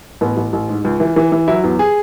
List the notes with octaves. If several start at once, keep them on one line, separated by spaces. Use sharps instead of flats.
A1 B3
A1
A1
G#2
C#2
E3
E3
E3
F#3 E4
E2
G#4